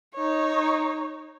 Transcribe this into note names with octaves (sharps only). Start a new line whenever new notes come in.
D#4 C#5